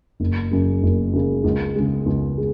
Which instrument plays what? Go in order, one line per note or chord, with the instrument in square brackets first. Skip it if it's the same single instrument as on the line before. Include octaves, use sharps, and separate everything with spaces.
[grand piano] F#1
F#2 C#3
F#1
F#2 C#3
C#2
C#3 G#3
C#2
G#3